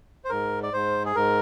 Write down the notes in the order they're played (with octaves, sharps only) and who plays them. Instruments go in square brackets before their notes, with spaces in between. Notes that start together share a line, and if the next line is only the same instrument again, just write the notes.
[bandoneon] C5
G#2 A#4
D5
G#2 C5
G#4
G#2 A#4